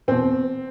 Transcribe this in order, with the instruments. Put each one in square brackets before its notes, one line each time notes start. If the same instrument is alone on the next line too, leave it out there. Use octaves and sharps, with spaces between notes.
[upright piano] E2 B2 C4